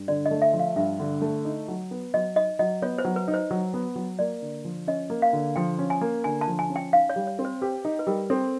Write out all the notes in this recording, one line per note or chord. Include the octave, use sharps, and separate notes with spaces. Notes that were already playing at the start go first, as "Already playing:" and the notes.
Already playing: G2
D3 D5
D#5
A3
E5
F3
F5
G2 E5
D3
A3
D#4
F#3
B3
F#3 D#5
D#4 D#5
F#3 D#5
B3 C#5
C5
F#3
B4
D#4
C5
F#3
B3
F#3
A#3 D5
D3
F3
C#4 D#5
A#3
F5
D3
F3 G5
C#4
G#5
A#3
D3 G#5
A5
F3
G#5
C#4
G5
D#4 F5
C#5
G3
C#5
C4
C5
G4 B4
D#4
B4
G3 A#4
C4 A4